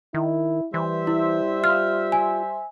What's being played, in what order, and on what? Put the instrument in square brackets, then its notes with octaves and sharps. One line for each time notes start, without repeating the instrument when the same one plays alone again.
[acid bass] D#3 [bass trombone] E4
[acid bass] E3 [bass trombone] G3 [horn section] C5 E5
[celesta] E4
[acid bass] F4 [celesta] F6
[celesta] G#5